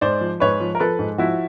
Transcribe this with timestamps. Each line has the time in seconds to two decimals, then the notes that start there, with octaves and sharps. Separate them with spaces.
0.01 G#2 C5 D5
0.21 F3
0.40 G#2 B4 C#5
0.60 F3
0.75 A#4
0.80 F3 A4 B4
0.99 G#2
1.18 F3 E4 F#4